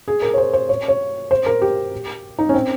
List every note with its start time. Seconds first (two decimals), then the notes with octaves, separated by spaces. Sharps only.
0.08 G#4
0.22 A#4
0.34 C#5
0.38 C5
0.53 C5
0.69 C#5
0.88 C#5
1.31 C5
1.46 A#4
1.62 G4
2.39 D#4
2.49 C#4
2.54 C4